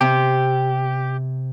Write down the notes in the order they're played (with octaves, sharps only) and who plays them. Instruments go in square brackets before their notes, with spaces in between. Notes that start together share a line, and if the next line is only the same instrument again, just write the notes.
[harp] C3 [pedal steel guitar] G4